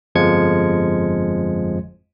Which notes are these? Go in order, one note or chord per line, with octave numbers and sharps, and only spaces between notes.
G1 F2 F3 G#3 G#6 C#7